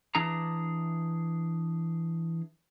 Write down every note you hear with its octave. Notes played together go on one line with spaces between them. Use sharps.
E3 D4 G#4 A#5